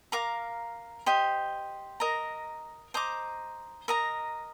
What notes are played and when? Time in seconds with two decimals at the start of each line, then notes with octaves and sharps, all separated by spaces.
0.12 A#4 F5 A#5 D6
1.06 G4 C5 D#5
2.00 A#4 D#5 A#5
2.94 C5 D#5 A#5 D6
3.88 A#4 D#5 A#5